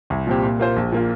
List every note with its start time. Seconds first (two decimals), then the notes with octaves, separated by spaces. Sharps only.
0.10 C2
0.27 A#2 F3 C4 G4
0.43 A#2
0.59 A#3 F4 C5
0.76 A#1
0.92 A#2 A#3 F4